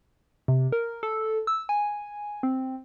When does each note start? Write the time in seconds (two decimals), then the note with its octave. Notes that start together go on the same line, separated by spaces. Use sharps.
0.48 C3
0.72 A#4
1.03 A4
1.47 E6
1.69 G#5
2.43 C4